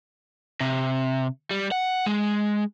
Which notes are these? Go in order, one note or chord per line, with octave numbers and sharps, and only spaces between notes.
C3
G3
F#5
G#3